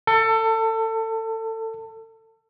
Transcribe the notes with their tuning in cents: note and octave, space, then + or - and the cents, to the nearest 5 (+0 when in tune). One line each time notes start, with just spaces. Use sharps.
A4 +25